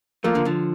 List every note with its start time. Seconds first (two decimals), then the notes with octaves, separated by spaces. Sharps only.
0.24 F3 A3 A#3
0.35 D3 F3
0.45 D3 F3